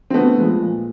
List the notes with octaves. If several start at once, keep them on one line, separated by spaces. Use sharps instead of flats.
C4
D3 A3 B3
F3 G#3
A#2